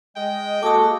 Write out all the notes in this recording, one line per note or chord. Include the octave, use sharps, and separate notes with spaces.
G#3 D#5 G5
G#3 A#3 F#4 A4 D6 D#6